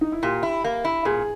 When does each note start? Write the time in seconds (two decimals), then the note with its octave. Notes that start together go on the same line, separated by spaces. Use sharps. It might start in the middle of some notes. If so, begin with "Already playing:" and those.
0.01 D#4
0.12 E4
0.23 A#2 G4
0.43 E4
0.64 A#3
0.85 E4
1.05 A#2 G#4